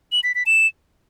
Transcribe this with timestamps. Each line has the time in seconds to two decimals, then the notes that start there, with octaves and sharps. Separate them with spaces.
0.12 F#7
0.23 B6
0.35 B6
0.46 E7